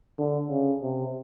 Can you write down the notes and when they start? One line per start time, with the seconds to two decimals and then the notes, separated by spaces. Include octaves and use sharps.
0.18 D3
0.50 C#3
0.82 C3